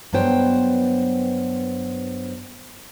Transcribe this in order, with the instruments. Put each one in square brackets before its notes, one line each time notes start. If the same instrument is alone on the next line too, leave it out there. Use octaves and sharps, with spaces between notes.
[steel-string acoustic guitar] G2 F#3 B3 C5 G5